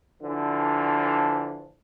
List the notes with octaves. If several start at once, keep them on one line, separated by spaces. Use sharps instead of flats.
D3 E3 F3